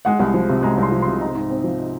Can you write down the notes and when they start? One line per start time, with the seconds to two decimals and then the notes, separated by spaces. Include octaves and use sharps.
0.05 G#3 F#5
0.20 C2
0.34 F3
0.49 C3
0.63 G#3 A#5
0.78 C2 C6
0.92 F3
1.02 C3 C6
1.20 D#4 A#5
1.35 G#2
1.50 C4
1.64 F3
1.79 D#4